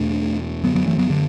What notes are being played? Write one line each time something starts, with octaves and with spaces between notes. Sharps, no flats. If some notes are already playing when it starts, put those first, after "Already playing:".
Already playing: E2 B2 A3 D4
F#2 D3 F#3 B3
F#3 B3
E3 A3
F#3 B3
D3